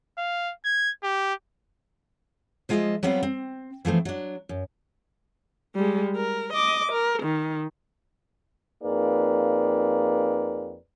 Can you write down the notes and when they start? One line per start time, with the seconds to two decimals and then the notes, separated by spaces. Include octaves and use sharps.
0.18 F5
0.65 G#6
1.03 G4
2.69 F3 G#3 F4 C#5 D#5 E5
3.03 F#3 G3 B3 C4 F4 F5
3.23 C4
3.85 E3 F3 A3 C4
4.05 F#3 D4
4.49 F#2
5.75 G3 G#3
6.16 A#4
6.53 D#5 D6
6.92 A#4
7.22 D#3
8.83 F2 A#3 D#4 G#4 B4 D5